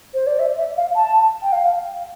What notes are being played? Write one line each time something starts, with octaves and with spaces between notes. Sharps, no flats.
C5
D5
E5
E5
F5
A5
G5
F5